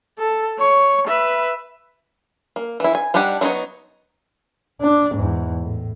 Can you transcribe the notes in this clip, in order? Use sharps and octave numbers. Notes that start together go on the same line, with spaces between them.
A4
C#5 C#6
B4 E5
A#3
E3 E4
G#5
G3 D4 D#4 G4 F#5
F#3 G#3 B3 D#4 C#5
D4
E2 G#2
A2